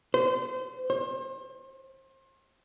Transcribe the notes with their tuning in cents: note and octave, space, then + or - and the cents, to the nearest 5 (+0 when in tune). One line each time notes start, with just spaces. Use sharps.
C5 -30
C5 +35